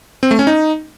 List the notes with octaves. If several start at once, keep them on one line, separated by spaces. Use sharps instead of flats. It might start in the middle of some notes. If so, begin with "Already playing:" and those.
C4
A3
C#4
D#4